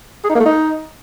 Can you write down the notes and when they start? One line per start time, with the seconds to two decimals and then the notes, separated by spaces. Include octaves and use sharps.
0.24 G#4
0.30 D#4
0.35 A#3
0.40 A3
0.46 D#4